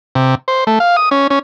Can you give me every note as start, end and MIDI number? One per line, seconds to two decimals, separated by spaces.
0.15 0.35 48
0.48 0.64 72
0.67 0.79 57
0.80 0.96 77
0.97 1.09 87
1.11 1.27 61
1.30 1.39 61